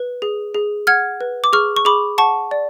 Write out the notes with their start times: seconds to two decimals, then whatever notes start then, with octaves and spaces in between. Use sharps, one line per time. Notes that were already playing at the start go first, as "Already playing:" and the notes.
Already playing: B4
0.22 G#4
0.54 G#4
0.87 F#5 F6 G#6
1.21 B4
1.44 D6
1.53 G#4 C#6 F6
1.76 C#6
1.85 G#4 B5 D6
2.18 F#5 A5 C#6
2.51 D5